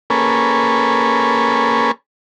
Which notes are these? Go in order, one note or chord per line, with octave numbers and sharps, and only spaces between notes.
A#3 C#4 G#4 A4 B4